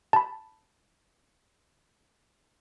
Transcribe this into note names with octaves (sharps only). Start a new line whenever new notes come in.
A5 B5